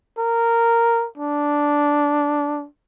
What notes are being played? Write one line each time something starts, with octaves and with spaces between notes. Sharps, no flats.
A#4
D4